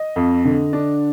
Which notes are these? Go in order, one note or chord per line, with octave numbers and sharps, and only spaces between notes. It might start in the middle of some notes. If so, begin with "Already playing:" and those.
Already playing: D#5
F2
D3
D4